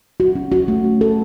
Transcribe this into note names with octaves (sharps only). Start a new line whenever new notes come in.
F#4
C#4
F#4
A3
C#4
A4